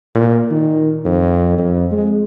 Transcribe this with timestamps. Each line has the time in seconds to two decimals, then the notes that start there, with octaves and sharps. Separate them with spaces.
0.15 A#2
0.51 D#3
1.05 F2
1.58 F2
1.92 G#3